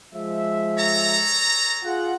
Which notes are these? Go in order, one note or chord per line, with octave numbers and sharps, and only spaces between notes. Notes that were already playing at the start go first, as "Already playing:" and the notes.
F3 G#3 E5
A4 C#5 A#5
F4 G#4 F#5